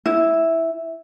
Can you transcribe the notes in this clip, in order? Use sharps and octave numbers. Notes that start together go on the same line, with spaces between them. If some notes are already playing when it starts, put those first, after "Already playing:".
E4